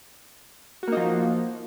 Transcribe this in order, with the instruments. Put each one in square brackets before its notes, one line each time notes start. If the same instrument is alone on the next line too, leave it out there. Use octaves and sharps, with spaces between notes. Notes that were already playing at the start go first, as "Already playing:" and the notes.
[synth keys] F#4
A#3
D#4
F3